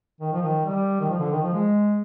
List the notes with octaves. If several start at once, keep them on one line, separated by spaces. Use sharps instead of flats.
D#3
F3
D#3
G3
D#3
F3
D3
D#3
F3
G#3